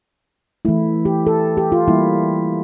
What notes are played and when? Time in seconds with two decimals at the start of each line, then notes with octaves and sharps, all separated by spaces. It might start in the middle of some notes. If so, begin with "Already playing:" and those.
0.65 E3 A3 E4
1.05 G4
1.27 A4
1.57 G4
1.72 F4
1.88 E3 G3 A#3 E4